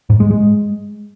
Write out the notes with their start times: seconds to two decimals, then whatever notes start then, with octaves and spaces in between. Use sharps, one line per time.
0.10 G#2
0.20 G#3
0.31 G#3